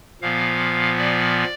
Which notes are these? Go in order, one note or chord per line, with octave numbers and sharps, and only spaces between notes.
A#2 F3 B3 F5
D5